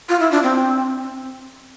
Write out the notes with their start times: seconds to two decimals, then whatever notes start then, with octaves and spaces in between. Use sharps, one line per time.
0.09 F4
0.20 E4
0.31 D4
0.43 C4
1.00 C4